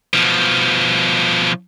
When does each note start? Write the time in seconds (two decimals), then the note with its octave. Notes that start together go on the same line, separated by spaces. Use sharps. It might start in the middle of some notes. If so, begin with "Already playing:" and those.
0.13 B2 F3